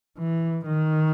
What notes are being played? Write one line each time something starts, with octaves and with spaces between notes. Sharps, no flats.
E3
D#3